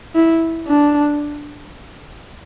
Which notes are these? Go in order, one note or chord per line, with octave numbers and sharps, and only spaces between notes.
E4
D4